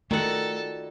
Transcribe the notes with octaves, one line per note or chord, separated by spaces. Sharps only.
D#3 A3 F4 F#4 A4 D5 F#5